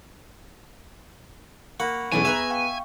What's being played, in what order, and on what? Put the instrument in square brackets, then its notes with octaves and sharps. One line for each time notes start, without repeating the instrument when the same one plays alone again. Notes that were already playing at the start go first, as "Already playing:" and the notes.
[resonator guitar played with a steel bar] A#3 [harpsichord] F#5 [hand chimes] B5 C#6
[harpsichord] B1 E2 [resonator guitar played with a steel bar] E3 A3 C#4 [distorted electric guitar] G#5 [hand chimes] C#6
[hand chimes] B3 G#6 [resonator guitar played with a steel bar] G#4 B4 A#5 [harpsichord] E5
[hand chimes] F5 G5 C#6